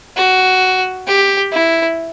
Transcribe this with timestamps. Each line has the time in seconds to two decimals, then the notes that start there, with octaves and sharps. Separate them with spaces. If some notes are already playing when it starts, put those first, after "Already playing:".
0.17 F#4
1.07 G4
1.52 E4